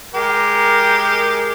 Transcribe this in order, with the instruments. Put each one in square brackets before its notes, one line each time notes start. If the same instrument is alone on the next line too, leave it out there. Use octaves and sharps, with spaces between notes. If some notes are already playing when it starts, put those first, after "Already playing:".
[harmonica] G#3 G4 [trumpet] A#4